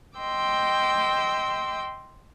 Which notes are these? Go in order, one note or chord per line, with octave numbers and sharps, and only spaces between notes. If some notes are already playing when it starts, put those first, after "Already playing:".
D#5 G5 C6 D6 E6